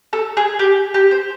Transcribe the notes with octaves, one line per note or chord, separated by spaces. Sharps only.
A4
G#4
G4
G4
C5